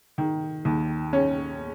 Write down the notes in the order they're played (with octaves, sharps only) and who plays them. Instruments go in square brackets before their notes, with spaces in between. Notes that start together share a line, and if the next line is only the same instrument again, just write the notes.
[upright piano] D#3
D#2
C#4